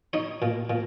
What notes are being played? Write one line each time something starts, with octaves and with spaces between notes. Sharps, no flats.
D#4 C#5
A#2
A#2